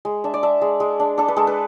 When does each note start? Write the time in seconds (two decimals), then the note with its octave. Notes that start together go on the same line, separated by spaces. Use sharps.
0.05 G#3
0.24 D4 E5
0.34 D5
0.43 D4 E5
0.62 G#3
0.80 G#3
1.00 D4
1.18 D4 A4
1.28 B4
1.36 G#3 A4
1.47 B4